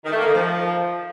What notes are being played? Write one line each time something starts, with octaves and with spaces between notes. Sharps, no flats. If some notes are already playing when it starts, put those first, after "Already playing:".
D#3
A3
A#3
D#3
F3